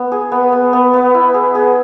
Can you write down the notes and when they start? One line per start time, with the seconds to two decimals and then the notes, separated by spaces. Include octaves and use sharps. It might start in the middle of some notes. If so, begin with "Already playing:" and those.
Already playing: B3
0.12 G#4
0.32 B3
0.52 B3
0.73 B3
0.93 B3
1.14 E4
1.34 G#4
1.55 G#4